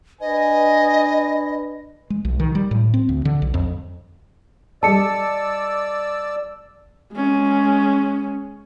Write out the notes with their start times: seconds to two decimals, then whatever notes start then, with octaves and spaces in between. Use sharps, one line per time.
0.21 D4 B4 D#5 G#5
2.10 G#3
2.25 B1
2.40 D#3
2.55 G3
2.71 A2
2.94 C4
3.09 D2
3.25 D3
3.42 B1
3.54 F2
4.83 G3 A4 D5 D#5 A5 E6 C#7
7.13 G#3 C#4